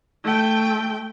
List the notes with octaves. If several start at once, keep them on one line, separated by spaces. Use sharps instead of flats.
A3 G5